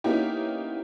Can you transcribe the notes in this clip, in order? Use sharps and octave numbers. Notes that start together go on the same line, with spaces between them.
A#3 B3 C#4 D#4 E4 G4